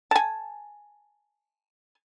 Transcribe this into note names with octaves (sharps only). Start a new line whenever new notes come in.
G#5 A5